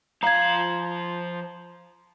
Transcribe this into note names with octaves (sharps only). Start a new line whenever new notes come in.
F3 F5 A#5 G#6